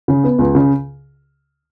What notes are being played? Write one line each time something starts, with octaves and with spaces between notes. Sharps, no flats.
C#3
B3
C#2
C#3